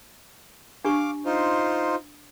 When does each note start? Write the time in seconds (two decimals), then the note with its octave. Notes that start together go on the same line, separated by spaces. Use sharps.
0.85 D4 G4 F5 C#6 D6
1.25 D#4 F4 C5